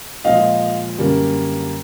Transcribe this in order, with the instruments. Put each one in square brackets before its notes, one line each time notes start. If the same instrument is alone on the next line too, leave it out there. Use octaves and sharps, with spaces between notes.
[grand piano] A#2 F3 G#3 D#5 F5
F#2 D3 G3 A#3